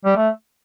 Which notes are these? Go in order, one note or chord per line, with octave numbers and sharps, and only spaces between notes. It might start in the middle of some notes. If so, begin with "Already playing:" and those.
G3
A3